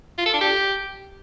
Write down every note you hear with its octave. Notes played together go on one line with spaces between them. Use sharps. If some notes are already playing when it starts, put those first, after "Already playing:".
F4
A4
D4
G4